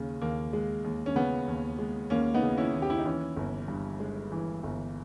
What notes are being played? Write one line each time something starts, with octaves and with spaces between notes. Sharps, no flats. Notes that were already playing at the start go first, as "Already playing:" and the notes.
Already playing: D#2 C#3
D#2 A#3
G#3
D#2
C#4
C#3 B3
D#2
G#3
D#2 A#3 C#4
B3 D#4
C#3
C#4 E4
D#2
G4
E4
D#4
E3 C#4 E4
G1
G2
G#3
E3
G1